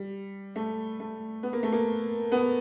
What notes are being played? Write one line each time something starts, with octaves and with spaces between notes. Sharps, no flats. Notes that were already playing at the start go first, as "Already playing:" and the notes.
Already playing: G3
A3
A3
B3
A#3
A3
A#3
B3